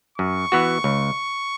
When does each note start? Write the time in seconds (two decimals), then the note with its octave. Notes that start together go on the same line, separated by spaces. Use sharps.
0.18 F#2 C#6
0.52 E3 B3 F#4
0.84 C#2